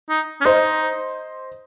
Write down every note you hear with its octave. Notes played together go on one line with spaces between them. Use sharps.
D#4
C#4
D#4 C5 D#5